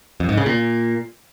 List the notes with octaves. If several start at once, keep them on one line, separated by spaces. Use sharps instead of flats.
F2
G#2
C#3
A#2